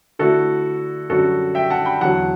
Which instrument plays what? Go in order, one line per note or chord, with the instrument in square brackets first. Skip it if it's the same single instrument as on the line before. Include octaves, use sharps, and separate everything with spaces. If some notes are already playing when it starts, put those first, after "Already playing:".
[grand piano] D3 A3 E4 F#4 A4
F#2 D3 G3 F#4 A4
E5 G5
F#5 A5
G5 B5
E2 D3 F#3 F#5 A5